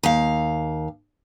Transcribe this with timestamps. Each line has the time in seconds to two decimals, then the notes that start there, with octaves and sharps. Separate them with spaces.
0.03 D#2 F5